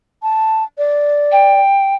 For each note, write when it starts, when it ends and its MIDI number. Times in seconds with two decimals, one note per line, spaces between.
0.23 0.64 81
0.78 1.60 74
1.32 1.95 79